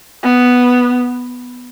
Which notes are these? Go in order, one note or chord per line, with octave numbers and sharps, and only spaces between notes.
B3